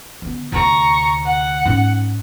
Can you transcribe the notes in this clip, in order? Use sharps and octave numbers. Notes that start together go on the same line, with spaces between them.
D3 B3
D2 C3 A#5 C#6
F#5
G#2 C#4